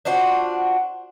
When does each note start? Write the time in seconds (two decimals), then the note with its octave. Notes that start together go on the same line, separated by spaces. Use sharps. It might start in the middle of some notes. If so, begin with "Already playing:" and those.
0.05 D4 F4 F#4 C5